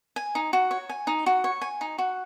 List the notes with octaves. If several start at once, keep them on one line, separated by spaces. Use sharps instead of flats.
G#5
D#4
F#4
C#5
G#5
D#4
F#4
C#5
G#5
D#4
F#4